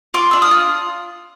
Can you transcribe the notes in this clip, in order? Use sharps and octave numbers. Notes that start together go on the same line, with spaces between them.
F4 C6 D6
D4 E6
D#6 F6
F4